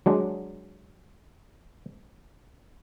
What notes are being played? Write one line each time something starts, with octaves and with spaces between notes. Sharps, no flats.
F#3 G#3 D4